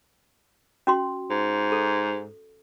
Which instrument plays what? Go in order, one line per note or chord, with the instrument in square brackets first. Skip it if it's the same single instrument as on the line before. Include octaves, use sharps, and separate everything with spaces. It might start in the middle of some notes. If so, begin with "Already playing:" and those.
[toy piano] C#4 F#4 C6
[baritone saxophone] G#2
[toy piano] A4